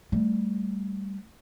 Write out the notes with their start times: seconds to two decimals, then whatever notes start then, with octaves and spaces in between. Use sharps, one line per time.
0.12 G3 A3